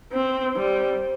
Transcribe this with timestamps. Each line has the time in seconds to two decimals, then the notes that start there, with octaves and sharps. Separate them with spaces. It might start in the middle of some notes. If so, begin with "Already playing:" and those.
0.12 C4 C5
0.56 G3